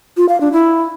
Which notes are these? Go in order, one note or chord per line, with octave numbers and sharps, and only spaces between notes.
F4
F5
D4
E4